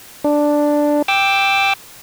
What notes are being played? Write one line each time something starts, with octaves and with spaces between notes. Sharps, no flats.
D4
G5 D6 E6